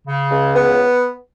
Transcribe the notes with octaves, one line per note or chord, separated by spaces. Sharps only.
C#3
C#2
B3